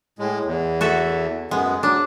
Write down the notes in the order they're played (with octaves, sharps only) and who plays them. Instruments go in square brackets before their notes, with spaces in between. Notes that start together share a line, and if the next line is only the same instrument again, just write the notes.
[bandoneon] A2 G#3
E2
[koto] F#4 A4 E5
[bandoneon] F#2 B3 [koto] G#3
[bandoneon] F#3 [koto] D4